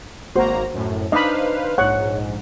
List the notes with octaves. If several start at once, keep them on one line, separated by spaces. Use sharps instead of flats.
G#1 A#3 F#4 C5 A#5
F#2 A2
D4 D#4 B4 C5 D#5 F5 B5
A#1 G#2 C#5 F#5